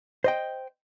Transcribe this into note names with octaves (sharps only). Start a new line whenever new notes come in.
C5 D#5 G5